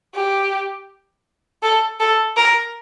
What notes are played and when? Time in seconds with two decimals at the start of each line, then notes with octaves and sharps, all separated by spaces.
0.15 G4
1.63 A4
2.00 A4
2.37 A#4